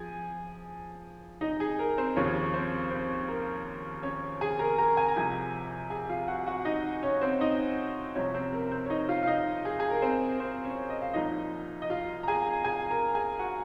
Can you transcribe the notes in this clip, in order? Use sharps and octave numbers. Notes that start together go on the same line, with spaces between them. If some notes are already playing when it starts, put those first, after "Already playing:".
Already playing: F3 G#4 G#5
D#4 D#5
G#4
A#4
C4 C5
D#2 C#3 F3 C#4 C#5
C4 C5
C4 C5
A#4
C#4 C#5
G#4 G#5
A#4 A#5
A#4 A#5
G#5
A#5
C2 C3 F3 G#4 G#5
G#4 G#5
F4 F5
F#4 F#5
F#4 F#5
D#4 D#5
C#4 C#5
C4 C5
D#4 D#5
C2 C3 F3 C#4 C#5
C4 C5
A#4
C4 C5
C#5
D#4 D#5
F4 F5
F5
D#4 D#5
G#4
G#4
A#4
C4 C5
C4 C5
C#4 C#5
D#5
F5
C2 A#2 F3 D#4 D#5
D#5
F4 F5
A#5
G#4 G#5
G#4 G#5
A#4 A#5
G#4 G#5
F#4 F#5